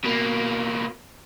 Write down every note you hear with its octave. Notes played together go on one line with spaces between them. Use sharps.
B2 A#3